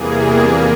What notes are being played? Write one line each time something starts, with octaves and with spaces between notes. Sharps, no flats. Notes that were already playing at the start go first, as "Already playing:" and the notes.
Already playing: E2 C3 E3 G3 A#3 G#4
F3 A#3 A#4